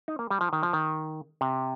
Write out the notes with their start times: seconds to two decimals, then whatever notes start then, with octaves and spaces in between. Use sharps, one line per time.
0.08 D#4
0.19 A#3
0.30 G3
0.41 F3
0.53 D#3
0.63 F3
0.73 D#3
1.41 C3